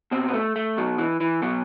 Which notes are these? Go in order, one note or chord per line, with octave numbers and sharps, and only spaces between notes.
B2 C4
B3
A3
A3
B2 F#3
E3
E3
B2 F#3